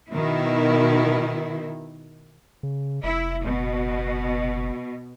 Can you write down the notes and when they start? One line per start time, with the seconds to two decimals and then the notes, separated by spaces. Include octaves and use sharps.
0.12 B2 D#3 E4
2.63 C#3
3.03 F1 E4
3.46 F#1 B2